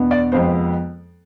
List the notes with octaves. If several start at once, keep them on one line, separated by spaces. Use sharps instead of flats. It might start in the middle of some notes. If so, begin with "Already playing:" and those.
Already playing: E2 B2 B3 D4
D5
F2 C3 F3 G#3 B3 C5
C5